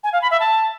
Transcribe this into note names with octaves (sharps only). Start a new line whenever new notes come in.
G#5
F5
B5
E5
A5